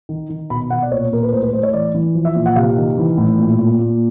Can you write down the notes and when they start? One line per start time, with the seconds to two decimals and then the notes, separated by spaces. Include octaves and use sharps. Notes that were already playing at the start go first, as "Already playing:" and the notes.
0.09 D#3
0.30 D#3
0.50 B2 B5
0.70 B2 F#5
0.82 D5
0.91 A#2 C#5
1.12 A#2 A#4
1.23 B4
1.32 A2 C5
1.43 B4
1.53 A2 C5
1.63 C#5
1.73 E3 D5
1.94 E3
2.15 F3
2.25 E5
2.35 A#2
2.46 F#5
2.56 C3 F5
2.77 D#3
2.97 E3
3.18 A2
3.38 A#2
3.59 A#2
3.79 A#2